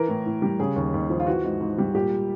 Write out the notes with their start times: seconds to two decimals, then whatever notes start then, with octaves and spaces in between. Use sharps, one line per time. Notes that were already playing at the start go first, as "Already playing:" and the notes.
Already playing: E3 A#4
0.08 A2
0.26 A2
0.42 G3
0.60 C#3 G#4
0.76 D#2
0.94 D#2
1.10 F3
1.20 F4
1.27 E3 F#4
1.44 G#2
1.61 G#2
1.78 G3
1.95 A#2 G4